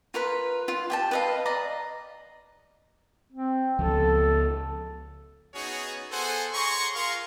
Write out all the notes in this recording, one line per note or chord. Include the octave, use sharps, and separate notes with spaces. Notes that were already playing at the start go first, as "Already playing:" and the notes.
F4 A#4 B4
F4
G4 G5 A5
B4 D#5 F5
D5 D#5 A#5
C4
C#2 F3 A4
B3 C#4 D#4 F#4 G#4 C#5
B3 G#4 A4 C5 F#5 G#5
G#4 C#5 A#5 C6 C#6
F4 G#4 A#4 F5 C6 C#6